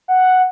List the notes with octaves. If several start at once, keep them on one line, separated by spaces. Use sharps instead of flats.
F#5